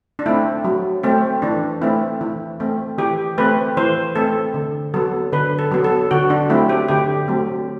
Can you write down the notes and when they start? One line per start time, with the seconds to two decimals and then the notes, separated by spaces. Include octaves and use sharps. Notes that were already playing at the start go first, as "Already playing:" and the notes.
0.19 D4
0.26 A3 C4 E4
0.64 F#3
1.03 A3 C4
1.42 E3 D4
1.82 A3 C4 E4
2.21 E3 E4
2.60 A3 C4
2.98 E3 G4
3.38 A3 C4 B4
3.77 E3 C5
4.15 A3 C4 A4
4.54 D3
4.94 F#3 B3 A4
5.32 D3 B4
5.59 A4
5.72 F#3 B3
5.84 A4
6.11 D3 F#4
6.30 D4
6.49 F#3 A3 C4 E4
6.69 G4
6.88 D3 G4
7.28 F#3 A3 C4